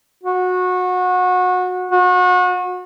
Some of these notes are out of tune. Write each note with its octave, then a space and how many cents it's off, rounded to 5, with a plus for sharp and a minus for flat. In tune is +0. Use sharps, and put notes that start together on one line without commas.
F#4 -25
F#4 -35